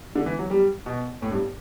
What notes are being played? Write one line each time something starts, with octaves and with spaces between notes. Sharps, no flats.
D3
E3
F#3
G3
B2
A2
G2